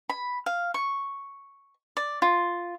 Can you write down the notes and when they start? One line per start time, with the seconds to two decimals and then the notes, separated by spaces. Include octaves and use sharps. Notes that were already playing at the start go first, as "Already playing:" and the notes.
0.09 B5
0.46 F5
0.74 C#6
1.97 D5
2.22 F4